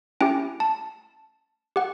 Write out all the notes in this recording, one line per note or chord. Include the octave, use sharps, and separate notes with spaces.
C#4 E4 G4 G5
A5
G4 F#5